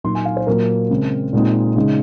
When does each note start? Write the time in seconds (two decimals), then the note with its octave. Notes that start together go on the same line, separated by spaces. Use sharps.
0.04 A#2 F#3 A#3 D#4 C6
0.15 G#5
0.25 F5
0.36 C5
0.47 A#2 F#3 A#3 A#4
0.90 C#3 G#3 C4
1.33 A#2 G#3 C4 D#4
1.76 C#3 G#3 D#4